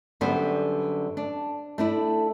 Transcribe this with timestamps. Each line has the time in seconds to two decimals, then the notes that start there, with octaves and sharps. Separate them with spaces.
0.21 F#2 D3 G3 B3 C5
1.17 D4
1.78 A3 D4 E4